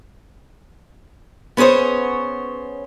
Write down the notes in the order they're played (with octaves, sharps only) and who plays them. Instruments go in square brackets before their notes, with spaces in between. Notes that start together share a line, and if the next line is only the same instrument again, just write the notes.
[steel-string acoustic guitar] B3 C#4 G#4 C5 C#5